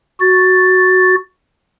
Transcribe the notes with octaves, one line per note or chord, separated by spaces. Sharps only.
F#4 A6